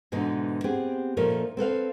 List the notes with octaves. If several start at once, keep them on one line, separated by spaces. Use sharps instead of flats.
G#2 B2 D3 E3 D#4
B3 C4 G4 G#4
A#2 F3 A3 C#4 D#4 A#4
C4 A4 B4 F5